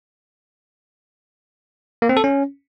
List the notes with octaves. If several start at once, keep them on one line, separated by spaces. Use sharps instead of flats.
A#3
C4
A4
C#4